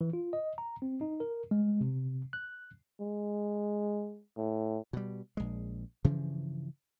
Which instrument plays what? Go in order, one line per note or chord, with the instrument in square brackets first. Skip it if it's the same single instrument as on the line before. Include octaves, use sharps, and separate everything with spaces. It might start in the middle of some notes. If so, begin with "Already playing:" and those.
[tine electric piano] E3
F4
D#5
A#5
C4
D#4
A#4
G#3
C3
F#6
[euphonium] G#3
A2
[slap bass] B2 G3
A#1 G#3
G2 C#3 E3 F3